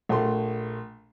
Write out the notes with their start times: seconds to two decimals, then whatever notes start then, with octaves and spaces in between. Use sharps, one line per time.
0.09 A#1 A3 C6